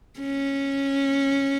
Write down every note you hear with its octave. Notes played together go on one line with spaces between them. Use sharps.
C#4